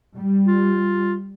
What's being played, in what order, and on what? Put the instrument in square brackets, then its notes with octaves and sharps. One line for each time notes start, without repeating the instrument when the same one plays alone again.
[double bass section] G3
[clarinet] F4